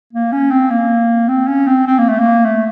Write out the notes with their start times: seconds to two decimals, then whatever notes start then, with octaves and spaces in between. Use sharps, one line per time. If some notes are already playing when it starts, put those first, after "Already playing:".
0.13 A#3
0.32 C#4
0.51 C4
0.71 A#3
1.29 C4
1.48 C#4
1.67 C4
1.87 C4
1.98 A#3
2.09 A3
2.19 A#3
2.45 A3